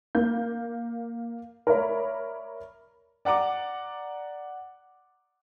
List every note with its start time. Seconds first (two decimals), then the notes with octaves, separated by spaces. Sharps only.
0.15 A#3 G6
1.67 A#4 C#5 D5 E5 B5
3.25 D5 F#5 A#5 D6